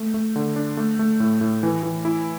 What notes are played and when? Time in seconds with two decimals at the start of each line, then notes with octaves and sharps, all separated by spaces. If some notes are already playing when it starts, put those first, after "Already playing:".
Already playing: A3
0.14 A3
0.36 D3
0.56 D4
0.77 A3
0.99 A3
1.20 A2
1.41 A2
1.63 E3
1.83 E3
2.05 E4